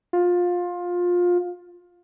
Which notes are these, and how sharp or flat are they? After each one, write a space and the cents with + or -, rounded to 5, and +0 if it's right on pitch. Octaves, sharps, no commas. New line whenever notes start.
F4 +20